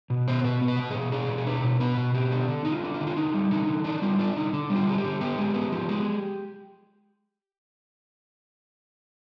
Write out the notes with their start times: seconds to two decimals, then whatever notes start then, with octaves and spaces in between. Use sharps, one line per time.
0.10 B2
0.28 B3 C5
0.44 B2 B4
0.61 B3
0.68 B4
0.79 B2
0.91 B2 G#4
1.12 D4 G#4
1.29 B2
1.38 G#4
1.47 D4 B4
1.64 B2
1.80 B3 B4
1.97 B2
2.14 B3 G4
2.31 D4
2.48 D3
2.65 D3 D#4
2.72 F4
2.83 D4
2.94 F4
3.00 D3
3.07 F4
3.16 D3 D#4
3.34 G3
3.51 D3 D#4
3.67 D3
3.84 D4 D#4
4.02 G3 F4
4.19 D4 F4
4.36 D3 D#4
4.53 D3 D4
4.70 G3
4.75 F4
4.87 D3 G#4
4.98 G4
5.04 D3
5.21 B3 G4
5.38 G#3
5.54 B3
5.72 F3
5.89 G#3